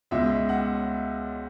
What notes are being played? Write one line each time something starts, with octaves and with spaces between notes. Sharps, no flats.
C#2 B2 G#3 E5
F#5